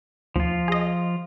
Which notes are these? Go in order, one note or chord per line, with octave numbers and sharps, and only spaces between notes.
D#2 F3 F4
G#4 D#5